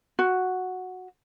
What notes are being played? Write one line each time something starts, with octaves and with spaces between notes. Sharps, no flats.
F#4